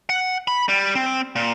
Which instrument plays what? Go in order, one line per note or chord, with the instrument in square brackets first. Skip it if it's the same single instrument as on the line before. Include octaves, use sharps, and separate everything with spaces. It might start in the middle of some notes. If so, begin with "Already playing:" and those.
[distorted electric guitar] F#5
B5
G3
C4
A#2